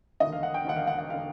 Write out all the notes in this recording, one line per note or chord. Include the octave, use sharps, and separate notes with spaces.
E1 D#2 D3 D#5
F5
F#5
G5
E1 D#2 D3 F#5
F5
F#5
F#5
D3 F5